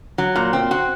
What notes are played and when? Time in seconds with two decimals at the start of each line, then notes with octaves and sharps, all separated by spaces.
0.18 F#3
0.36 A#2
0.53 C4
0.71 F#4